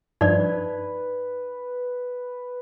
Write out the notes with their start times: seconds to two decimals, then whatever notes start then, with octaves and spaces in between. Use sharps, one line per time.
0.21 G2 F3 D#4 B4 D5